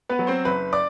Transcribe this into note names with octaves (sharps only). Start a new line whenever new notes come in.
B3 B4
F#3
C4 C5
F#1 B4 B5
D5 D6